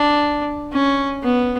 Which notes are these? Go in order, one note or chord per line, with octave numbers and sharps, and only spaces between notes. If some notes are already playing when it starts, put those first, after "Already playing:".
Already playing: D4
C#4
B3